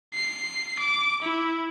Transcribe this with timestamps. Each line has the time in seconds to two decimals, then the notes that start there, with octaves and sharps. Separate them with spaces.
0.14 C7
0.79 D6
1.22 E4